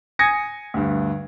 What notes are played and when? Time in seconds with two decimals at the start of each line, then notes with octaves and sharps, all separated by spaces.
0.19 G#5 D#6 G#6 A#6 C#7
0.74 D2 G2